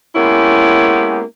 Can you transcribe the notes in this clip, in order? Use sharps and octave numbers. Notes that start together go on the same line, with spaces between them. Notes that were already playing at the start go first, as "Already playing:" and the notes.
G#3 A#3 B3 C#4 E4 G4